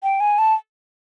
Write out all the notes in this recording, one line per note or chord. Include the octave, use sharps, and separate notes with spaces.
G5
G#5
A5